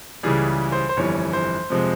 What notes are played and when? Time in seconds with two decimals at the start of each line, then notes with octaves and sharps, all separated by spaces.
0.23 C#2 C#3 E3 G3 G#4
0.72 C5
0.89 C5
0.97 G1 F2 E3 G3 C#5
1.33 C5
1.70 F2 C3 F3 G#3